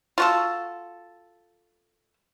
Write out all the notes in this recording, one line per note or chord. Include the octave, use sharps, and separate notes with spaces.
F4 F#4 A4